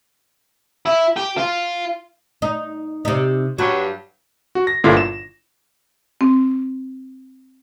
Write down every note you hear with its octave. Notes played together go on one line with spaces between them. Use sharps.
E4
G4
F4
D#4
C3 D#4
G2 F#3 F#4
F#4
A#6
G1 A#2 D3 B3 E4 F4
E7
C4